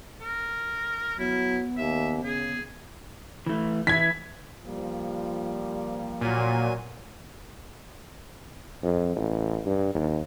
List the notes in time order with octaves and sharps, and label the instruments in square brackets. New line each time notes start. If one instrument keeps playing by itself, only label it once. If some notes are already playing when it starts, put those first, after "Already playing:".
[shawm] A#4
[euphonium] F#3 [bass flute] B3 [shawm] E4
[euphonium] D#2 [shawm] E5
[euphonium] C#3 [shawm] G#4
[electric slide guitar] E3 A3
[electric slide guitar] E3 E4 [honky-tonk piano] G#6 B6
[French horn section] F3 G3 A#3
[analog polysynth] A#2 [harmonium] F#3 G#5
[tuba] F2
A1
G2
D#2